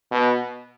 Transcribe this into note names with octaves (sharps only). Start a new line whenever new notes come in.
B2